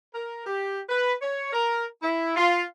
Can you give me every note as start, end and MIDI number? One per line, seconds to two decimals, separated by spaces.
0.14 0.42 70
0.46 0.80 67
0.88 1.13 71
1.21 1.52 73
1.53 1.86 70
2.02 2.35 64
2.36 2.64 65